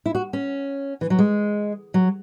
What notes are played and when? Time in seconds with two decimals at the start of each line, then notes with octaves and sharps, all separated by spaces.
0.06 E4
0.15 F#4
0.33 C#4
1.01 E3
1.10 F#3
1.19 G#3
1.94 F#3